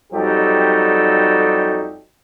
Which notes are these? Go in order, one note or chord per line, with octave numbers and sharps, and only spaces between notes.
F2 F#3 G3 D#4 G4 A4